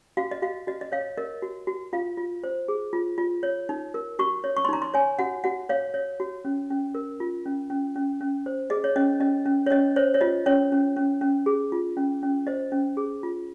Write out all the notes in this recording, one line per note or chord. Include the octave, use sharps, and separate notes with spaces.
F#4 F5
D#5
F#4 F5
F#4 D#5
D#5
C#5 F5
A#4 D#5
F#4
F#4
F4 F5
F4
C5
G#4
F4
F4
C#5
D#4
A#4
F#4 C#6
C#5
C#6
C6
D#4 A#5
C6
C#5 G#5
F#4 F#5
F#4 F#5
C#5 F5
C#5
F#4
C#4
C#4
A#4
F4
C#4
C#4
C#4
C#4
C5
G#4 D#5
C#5
C#4 D#5
C#4 D#5
C#4
C#5
C#4 D#5
C5 C#5
C#5
F4 D#5
C#4 C#5
C#4
C#4
C#4
G#4
F4
C#4
C#4
C5 D#5
C#4
G#4
F4